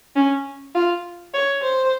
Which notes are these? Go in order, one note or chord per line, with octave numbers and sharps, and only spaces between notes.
C#4
F4
C#5
C5